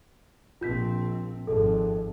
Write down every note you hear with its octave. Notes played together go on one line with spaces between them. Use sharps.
A#1 C4 F4 G6 B6
G#1 F2 A4